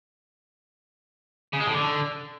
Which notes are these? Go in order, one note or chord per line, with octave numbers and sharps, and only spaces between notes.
C#3
G#3
A2
D3